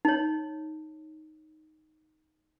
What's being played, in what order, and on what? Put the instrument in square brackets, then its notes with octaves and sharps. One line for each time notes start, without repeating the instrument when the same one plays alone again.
[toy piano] D#4 C#5